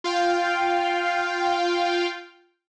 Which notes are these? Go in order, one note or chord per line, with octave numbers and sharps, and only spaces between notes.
F4 F5 G5